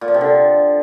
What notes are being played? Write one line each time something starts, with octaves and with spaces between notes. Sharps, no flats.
A#2
F3
C3
D3